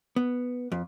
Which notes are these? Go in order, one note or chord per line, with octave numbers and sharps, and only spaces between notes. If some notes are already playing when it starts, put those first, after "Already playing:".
B3
F2